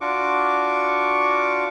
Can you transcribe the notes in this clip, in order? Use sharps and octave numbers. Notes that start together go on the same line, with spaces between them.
D4 F4 F#4 C#6 D6